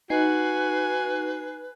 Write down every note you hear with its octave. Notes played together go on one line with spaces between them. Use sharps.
D#4 F#4 B4 G#5 C7